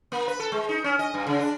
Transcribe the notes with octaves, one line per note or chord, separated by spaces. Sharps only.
A#3
B4
A4
G#3
D#4
C#4
D#5
G2
C#3
D4